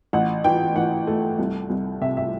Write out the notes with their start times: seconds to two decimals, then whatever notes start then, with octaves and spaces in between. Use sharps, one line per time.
0.13 A1 F#5
0.44 E3 G5
0.76 E3 F#5
1.07 A3
1.39 C2
1.70 C2
2.01 C3 E5
2.17 E5